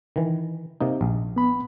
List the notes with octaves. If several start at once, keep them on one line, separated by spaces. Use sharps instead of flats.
D#3 E3
C3 A#3 D#4
A#1
B3 B5